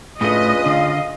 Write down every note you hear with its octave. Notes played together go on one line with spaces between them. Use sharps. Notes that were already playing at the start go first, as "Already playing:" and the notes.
A2 C#3 A3 D4 F4 B4 D#5
D3 F5